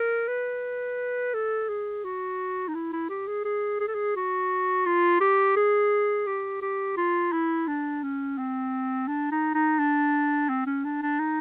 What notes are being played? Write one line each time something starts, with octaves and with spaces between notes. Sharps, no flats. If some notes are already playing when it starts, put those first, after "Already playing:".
Already playing: A#4
B4
A4
G#4
F#4
D#4
E4
E4
G4
G#4
G#4
G#4
A4
G#4
F#4
F4
G4
G#4
G4
G4
F4
E4
D4
C#4
C4
D4
D#4
D#4
D4
C4
C#4
D4
D4
D#4